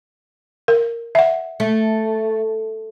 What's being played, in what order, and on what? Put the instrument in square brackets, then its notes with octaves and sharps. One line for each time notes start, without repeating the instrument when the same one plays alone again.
[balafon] A#4
E5 F#5
[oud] A3